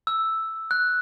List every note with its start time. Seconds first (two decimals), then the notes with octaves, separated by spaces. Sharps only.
0.07 E6
0.71 F#6